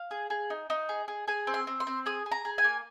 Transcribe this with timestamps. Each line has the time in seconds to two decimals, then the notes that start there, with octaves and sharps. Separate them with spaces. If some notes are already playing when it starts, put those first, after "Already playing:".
Already playing: F5
0.11 G#4
0.30 G#4
0.50 D#4
0.70 D#4
0.89 G#4
1.08 G#4
1.28 G#4 G#5
1.47 C4
1.54 C6
1.67 C4
1.80 C6
1.87 C4
2.06 G#4 D#6
2.26 G#4
2.32 A#5
2.45 G#4
2.58 G#5
2.64 A#3